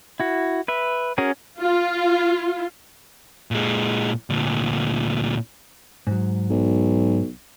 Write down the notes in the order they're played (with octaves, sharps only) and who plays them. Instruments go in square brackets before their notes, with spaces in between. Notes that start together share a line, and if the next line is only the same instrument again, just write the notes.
[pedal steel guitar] E4 F#4
B4 E5
C#4 F#4 G#4 A#4
[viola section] F4
[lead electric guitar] A#2 G#3
D2 A#2
[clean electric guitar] G#2 F#3
[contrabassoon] B1